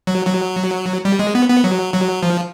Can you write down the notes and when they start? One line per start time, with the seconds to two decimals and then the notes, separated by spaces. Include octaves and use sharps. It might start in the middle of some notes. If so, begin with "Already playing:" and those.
0.07 F#3
0.27 F#3
1.05 G3
1.19 G#3
1.35 B3
1.49 B3
1.64 F#3
1.94 F#3
2.23 F3